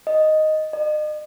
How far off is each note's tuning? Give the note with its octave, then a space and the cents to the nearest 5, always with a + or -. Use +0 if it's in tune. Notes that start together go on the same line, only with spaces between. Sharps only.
D#5 +0
D#5 -40